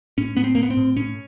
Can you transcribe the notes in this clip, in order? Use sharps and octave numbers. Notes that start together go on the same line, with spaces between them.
A2 C#4
A2 B3
C4
A#3
A2
B3
C4
A2
A2 C#4